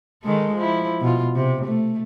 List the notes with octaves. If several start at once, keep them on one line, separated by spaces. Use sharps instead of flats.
D#3 G#3 A4
F3 E4
B2 F4
C3
A3